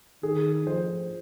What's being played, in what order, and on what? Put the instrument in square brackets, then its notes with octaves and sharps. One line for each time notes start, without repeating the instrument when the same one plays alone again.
[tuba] D#3 [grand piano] G#4
[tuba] F3 [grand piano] C5